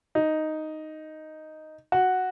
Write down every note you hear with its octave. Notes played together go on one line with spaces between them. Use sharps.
D#4
F#4